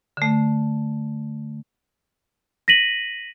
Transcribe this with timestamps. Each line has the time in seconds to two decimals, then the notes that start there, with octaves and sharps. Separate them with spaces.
0.17 D3 A3
2.68 A#6 B6 D#7 F#7